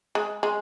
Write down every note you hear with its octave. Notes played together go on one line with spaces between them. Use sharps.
G#3
G#3